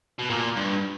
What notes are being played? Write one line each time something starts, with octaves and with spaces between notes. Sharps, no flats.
B2
A#2
G2